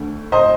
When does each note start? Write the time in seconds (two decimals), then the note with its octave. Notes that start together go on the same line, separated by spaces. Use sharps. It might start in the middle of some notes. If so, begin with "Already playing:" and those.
Already playing: D2 D3 A3
0.32 C5 D#5